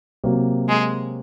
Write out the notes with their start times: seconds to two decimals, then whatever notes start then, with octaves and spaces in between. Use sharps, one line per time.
0.24 C3 F#3 A#3
0.68 G#3